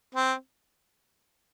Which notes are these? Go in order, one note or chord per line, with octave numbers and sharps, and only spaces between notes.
C4